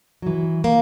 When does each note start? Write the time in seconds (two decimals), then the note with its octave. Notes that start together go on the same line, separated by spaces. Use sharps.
0.22 E3 F#3
0.64 A#3